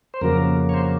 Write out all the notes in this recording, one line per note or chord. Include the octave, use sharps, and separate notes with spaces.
C5
F2 C#3 F#3 A#3 A#4
C#5
C5